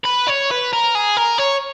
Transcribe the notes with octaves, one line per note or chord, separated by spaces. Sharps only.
B4
C#5
B4
A#4
G#4
A#4
C#5